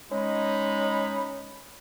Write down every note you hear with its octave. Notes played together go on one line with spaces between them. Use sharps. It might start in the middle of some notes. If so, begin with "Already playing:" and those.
G#3 C#4 D#4 B5